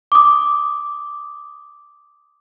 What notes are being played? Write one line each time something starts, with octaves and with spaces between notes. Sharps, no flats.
D6 D#6